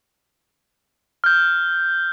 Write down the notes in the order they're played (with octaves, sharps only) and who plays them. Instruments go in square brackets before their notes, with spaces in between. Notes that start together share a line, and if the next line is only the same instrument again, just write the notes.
[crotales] F6 G6